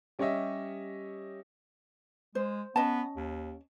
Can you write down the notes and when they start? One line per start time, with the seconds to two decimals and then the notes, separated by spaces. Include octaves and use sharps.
0.19 G3 C#4 G4 C#5 D#5 E5
2.35 G#3 C5
2.76 B3 C#4 D#5 A5
3.16 D#2